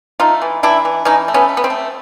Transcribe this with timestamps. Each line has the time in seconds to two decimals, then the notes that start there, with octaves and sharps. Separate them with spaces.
0.20 A3 D#4 F4
0.42 E3
0.63 E3 D4 E4
0.85 E3
1.05 E3 C#4 D#4
1.28 A3
1.34 B3 C#4
1.49 A3
1.57 B3
1.64 C4
1.70 A3